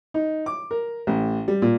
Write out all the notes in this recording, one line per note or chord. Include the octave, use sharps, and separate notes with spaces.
D#4
D6
A#4
A1
G3
A#2